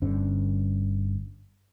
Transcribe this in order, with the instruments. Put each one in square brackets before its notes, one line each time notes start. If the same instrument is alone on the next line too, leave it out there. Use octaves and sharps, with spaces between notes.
[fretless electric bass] G1 G2 D3 C#4